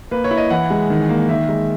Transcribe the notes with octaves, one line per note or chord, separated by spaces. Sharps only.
A#3 B4
C#5
E4
D#5
E3 F#5
G#3
D#3
A#3
D#3 E5
G#3